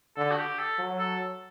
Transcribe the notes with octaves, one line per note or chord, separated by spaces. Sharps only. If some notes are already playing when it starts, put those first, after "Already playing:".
D3 A4
F#4
G4
A4
F#3
A4